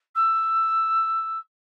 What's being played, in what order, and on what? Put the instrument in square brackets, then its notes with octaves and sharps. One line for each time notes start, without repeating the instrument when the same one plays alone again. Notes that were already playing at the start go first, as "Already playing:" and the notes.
[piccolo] E6